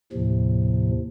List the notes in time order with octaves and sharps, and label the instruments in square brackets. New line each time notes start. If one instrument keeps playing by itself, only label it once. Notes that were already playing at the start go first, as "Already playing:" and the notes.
[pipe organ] D#2 A2 C3 F3